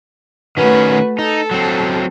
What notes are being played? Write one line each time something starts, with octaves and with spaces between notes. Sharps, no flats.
D#3 A3 C#4 F#4 B4
D#4 A4
F#3 C4